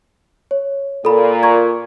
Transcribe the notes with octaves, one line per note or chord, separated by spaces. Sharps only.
C#5
A#2 A4 B5
A#5 C#6 G#6